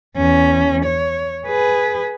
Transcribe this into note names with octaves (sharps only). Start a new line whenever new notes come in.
E2 C#4
C#5
G#4 B4